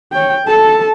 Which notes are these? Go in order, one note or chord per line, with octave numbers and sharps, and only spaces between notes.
C#5 G5
A4 A5